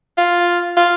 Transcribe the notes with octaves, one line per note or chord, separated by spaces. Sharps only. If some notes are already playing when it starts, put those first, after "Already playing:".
F4
F4